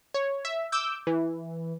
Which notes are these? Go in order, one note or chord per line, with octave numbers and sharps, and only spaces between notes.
C#5
E5
D6 E6 G6
E3